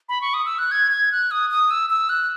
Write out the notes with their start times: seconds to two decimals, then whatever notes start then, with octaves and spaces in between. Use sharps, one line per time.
0.09 B5
0.21 C#6
0.34 D#6
0.45 E6
0.59 F#6
0.71 G#6
0.91 G#6
1.12 F#6
1.31 D#6
1.50 D#6
1.71 E6
1.90 E6
2.09 F#6